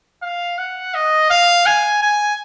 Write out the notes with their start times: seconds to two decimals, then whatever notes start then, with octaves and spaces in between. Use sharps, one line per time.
0.23 F5
0.58 F#5
0.94 D#5
1.30 F5
1.66 G#5
2.02 G#5